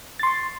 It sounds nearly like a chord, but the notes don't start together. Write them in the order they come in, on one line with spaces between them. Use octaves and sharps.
A6 C6 C#6